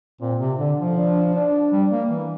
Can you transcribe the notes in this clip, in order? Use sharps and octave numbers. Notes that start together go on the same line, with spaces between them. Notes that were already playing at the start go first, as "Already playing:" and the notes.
A#2 C4
C3
D3 D4
F3
D4
D4
G3
A#3
E3